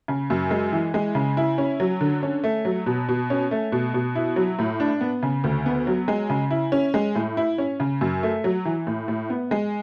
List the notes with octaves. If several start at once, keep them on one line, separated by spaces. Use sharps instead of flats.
C#3
F#2
G#3
E3
G#3
C#3
E4
C#4
F#3
D3
C#4
A3
F#3
B2
B2
C#4
A3
B2
B2
E4
F#3
A2
D4
B3
C#3
D2
B3
F#3
G#3
C#3
E4
C#4
G#3
A2
E4
C#4
C#3
F#2
A3
F#3
E3
A2
A2
B3
G#3